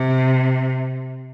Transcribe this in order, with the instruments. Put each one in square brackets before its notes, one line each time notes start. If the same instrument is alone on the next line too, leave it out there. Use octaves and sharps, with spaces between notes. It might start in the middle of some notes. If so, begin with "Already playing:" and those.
Already playing: [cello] C3